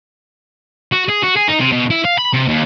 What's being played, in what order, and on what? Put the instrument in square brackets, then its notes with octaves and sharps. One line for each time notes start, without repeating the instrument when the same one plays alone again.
[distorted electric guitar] F#4
G#4
F#4
G#4
D#4
C3
B2
E4
F5
B5
C3
D#2